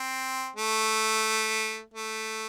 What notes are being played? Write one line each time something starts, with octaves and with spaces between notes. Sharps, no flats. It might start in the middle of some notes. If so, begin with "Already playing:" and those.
Already playing: C4
A3
A3